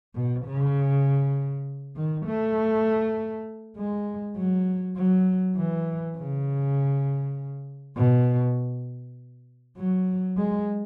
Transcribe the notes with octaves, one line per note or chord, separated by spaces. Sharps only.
B2
C#3
D#3
A3
G#3
F#3
F#3
E3
C#3
B2
F#3
G#3